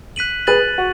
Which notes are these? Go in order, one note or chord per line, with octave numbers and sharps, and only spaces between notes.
F#6 B6 D#7 F#7
G#4 B4 F#6 A6 D#7 F#7
F#4